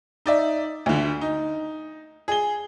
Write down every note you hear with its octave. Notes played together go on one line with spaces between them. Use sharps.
D#4 D5 E5
D2 D3
D#4
G#4 G7